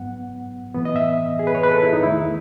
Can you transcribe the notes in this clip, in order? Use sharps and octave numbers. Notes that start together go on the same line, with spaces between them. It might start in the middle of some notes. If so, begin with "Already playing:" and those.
Already playing: G#2 F#3 B3 F#5
A2 E3 B3
D#5
E5
G#4
B4
C#5
B4
A4
E4
D#4
E2 D#3 A3 E4